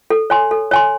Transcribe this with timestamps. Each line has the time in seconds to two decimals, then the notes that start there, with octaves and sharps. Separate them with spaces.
0.10 A4
0.30 C#5 G#5 C6
0.51 A4
0.71 C#5 G#5 C6